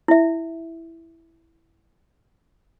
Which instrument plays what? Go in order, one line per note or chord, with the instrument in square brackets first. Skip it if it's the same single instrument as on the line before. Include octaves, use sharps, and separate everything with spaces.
[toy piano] E4 E5